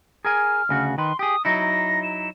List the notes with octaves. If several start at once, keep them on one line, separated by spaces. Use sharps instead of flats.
G#4 A#4 G#5 F6
D2 C#3 F#4
D#3 B4 C6
G4 G#4 D#6
F#3 D#4 E4 A#6
E7